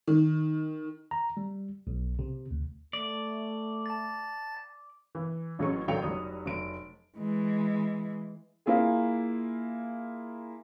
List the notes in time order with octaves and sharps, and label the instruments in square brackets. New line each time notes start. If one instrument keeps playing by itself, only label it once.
[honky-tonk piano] D#3
[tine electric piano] A#5
G3
B1
C3
D2
[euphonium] A3 [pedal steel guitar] D5
[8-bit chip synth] A5 A6
[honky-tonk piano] E3
A1 F#3 C#4 G#4 C#6
A1 D3 F#3 G5 C#7 F7
F1 F#3 G3 D#6
F1 F#3 D7
[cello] E3 G#3
[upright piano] A#3 E4 F4 G#4